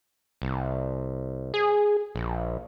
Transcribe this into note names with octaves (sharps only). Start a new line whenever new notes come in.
C2
G#4
A#1